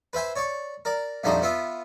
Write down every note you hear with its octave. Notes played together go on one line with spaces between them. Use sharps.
B4 C5 E5 G#5
C#5 D5 C#6
A#4 D5
A#1 F2 G3 A3 D#4 C5
B3 F4 E5